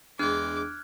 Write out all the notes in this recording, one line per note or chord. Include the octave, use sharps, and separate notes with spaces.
E2 G#3 D4 D6 F6 F#6 G#6